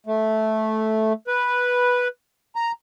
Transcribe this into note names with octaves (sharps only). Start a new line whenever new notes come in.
A3
B4
A#5